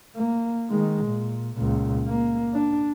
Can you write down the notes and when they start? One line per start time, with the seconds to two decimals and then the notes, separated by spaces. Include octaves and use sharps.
0.16 A#3
0.70 D#3 G#3
1.05 A#2
1.56 C#2 A#2
2.07 A#3
2.54 D4